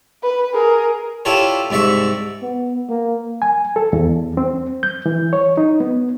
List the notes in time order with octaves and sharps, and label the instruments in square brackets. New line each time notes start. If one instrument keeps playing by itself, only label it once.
[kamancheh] B4
G#4 A#4
[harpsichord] E4 F4 G4 A4 C#5 D5
C2 G#2 D5 E5 C#6
[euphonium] B3
A#3
[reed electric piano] G#5
A4
E2
C4
G6
E3
C#5
D#4
B3